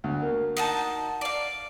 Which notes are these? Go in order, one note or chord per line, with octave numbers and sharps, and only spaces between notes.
D2
A#3
D#4 F#4 A5
D5 F5